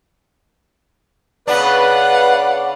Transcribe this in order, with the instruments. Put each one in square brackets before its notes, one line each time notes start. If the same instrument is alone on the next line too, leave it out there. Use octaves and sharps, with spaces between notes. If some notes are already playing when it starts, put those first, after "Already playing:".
[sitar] C#3 B3 D4 [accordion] B4 [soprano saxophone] D5 [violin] F5 F#5